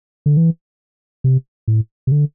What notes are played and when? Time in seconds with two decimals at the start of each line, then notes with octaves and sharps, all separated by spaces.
0.26 D3
0.37 E3
1.24 C3
1.68 A2
2.07 C3
2.12 D3